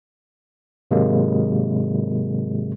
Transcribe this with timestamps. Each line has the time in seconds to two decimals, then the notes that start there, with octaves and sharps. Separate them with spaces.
0.91 G#2 C3 D#3 F#3 G#3 A#3